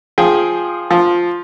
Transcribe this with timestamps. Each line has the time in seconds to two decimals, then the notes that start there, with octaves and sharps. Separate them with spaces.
0.18 F3 G#4 G5
0.91 F3